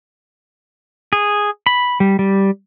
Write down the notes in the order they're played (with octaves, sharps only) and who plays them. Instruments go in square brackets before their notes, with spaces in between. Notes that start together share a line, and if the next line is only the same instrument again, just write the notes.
[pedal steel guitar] G#4
B5
G3
G3